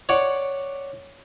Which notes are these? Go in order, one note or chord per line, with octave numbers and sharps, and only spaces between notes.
C#5 D5 F#5